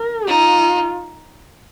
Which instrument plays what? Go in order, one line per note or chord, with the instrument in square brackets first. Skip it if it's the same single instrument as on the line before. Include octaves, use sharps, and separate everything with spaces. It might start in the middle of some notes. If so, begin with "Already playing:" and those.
Already playing: [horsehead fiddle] A#4
[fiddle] D#4 [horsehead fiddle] F4